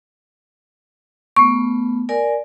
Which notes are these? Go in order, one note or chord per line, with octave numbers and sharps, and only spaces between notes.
A3 B3 C#6
A#4 D5 G#5